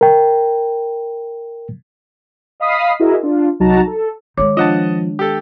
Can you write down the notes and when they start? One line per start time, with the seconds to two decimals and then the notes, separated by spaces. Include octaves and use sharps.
0.01 A#4 G5
2.60 D#5 F5 B5 D#6 B6 C7
3.00 E4 F#4 G#4 A#4 D#5 E5
3.22 D4 F4
3.60 C2 F#3 D#4 F#4 A5 A#5
3.87 A4
4.38 D#3 G#3 C#5 D6
4.57 F3 D4 D#5 F#5 A5
5.19 G4 A4